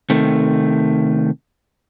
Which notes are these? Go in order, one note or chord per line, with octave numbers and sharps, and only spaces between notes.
C3 D#3 A3